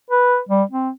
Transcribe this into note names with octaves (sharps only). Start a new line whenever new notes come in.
B4
G3
C4